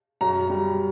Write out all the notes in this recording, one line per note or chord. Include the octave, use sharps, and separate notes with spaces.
F#2 A#5
G3